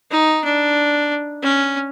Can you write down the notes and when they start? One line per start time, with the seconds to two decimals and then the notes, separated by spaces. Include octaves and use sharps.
0.11 D#4
0.44 D4
1.43 C#4